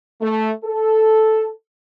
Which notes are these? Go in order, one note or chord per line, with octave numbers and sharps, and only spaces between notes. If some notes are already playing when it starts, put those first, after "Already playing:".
A3
A4